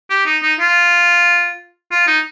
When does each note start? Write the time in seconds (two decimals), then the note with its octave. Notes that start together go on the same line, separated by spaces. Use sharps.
0.10 G4
0.26 D#4
0.42 D#4
0.59 F4
1.91 F4
2.07 D#4